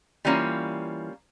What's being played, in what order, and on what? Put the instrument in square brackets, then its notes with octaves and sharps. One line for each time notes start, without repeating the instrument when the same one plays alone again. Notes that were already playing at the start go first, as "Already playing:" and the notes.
[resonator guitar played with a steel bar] E3 G3 A#3 C#4 F4